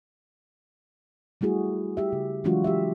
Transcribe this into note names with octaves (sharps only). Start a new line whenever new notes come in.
G3 A3 E4 F#4 G#4
G4 E5
C#3
E3 F#3 G#3 D4 F4 F#4
G4 E5